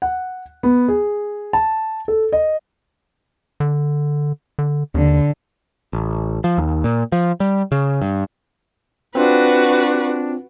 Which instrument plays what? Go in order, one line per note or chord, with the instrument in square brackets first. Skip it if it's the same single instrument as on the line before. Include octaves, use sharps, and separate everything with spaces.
[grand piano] F#5
B3
G#4
A5
A4
D#5
[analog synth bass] D3
D3
[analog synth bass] D#2 [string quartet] D3
[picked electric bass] A1
F3
D#2
A#2
F3
G3
C#3
G2
[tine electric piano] C4 F4 [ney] D4 [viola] F#4 B4